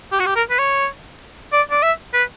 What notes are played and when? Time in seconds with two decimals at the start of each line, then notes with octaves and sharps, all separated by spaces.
0.12 G4
0.20 F#4
0.26 G4
0.36 A#4
0.50 B4
0.59 C#5
1.53 D5
1.71 D5
1.83 E5
2.14 B4